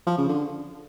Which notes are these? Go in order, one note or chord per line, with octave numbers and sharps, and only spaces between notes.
F3
C#3
D3